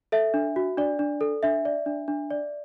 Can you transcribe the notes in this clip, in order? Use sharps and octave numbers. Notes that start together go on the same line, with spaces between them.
A4 E5
D4
F#4
D4 D5
D4
A4
D4 E5
D5
D4
D4
D5